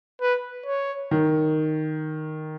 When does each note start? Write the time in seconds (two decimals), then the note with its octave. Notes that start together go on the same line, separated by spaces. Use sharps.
0.21 B4
0.66 C#5
1.11 D#3